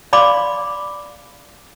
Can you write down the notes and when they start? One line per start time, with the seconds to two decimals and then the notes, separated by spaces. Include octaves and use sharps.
0.13 D5 F5 B5 C6 D6